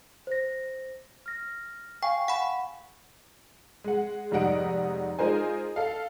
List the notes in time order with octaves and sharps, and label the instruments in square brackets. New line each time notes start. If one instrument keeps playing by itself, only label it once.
[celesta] C5 A#6
F6 A#6
[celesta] F5 G#5 C#6 [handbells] G5
[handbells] F#5 B5
[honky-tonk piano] G#3 F#5
F1 G#2 G3 D#4 F#5 D7
G#3 D#4 F4 A#4 C5 G#5
A4 F5